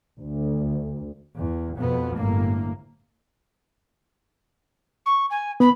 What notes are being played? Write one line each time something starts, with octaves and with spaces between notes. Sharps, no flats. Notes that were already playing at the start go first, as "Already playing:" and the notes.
D2
E2
F2 B2 B3
G1 A2 A#3
C#6
G#5
B3 B5